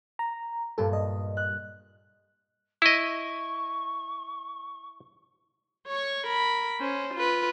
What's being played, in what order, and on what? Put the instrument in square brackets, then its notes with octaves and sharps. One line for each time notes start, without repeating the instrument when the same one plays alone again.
[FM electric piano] A#5
[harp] G2 A#2 [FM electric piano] A4
[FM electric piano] D#5
[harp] F#6
[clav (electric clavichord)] E4 D#5 [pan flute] C#6
[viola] C#5 C#6
A#4 B5
C#4 C5
F4 B4